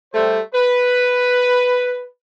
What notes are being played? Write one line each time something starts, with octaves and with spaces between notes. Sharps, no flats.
G3 A3 C5
B4